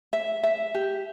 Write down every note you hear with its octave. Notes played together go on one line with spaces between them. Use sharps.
E5
E5
G4